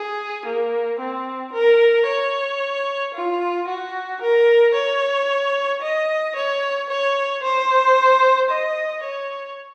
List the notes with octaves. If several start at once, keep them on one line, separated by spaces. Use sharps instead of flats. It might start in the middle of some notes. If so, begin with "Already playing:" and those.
Already playing: G#4
A#3
C4
A#4
C#5
F4
F#4
A#4
C#5
D#5
C#5
C#5
C5
D#5
C#5